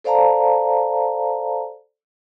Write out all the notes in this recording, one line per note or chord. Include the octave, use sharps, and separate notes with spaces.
A4 C5 D5 F5 A5 A#5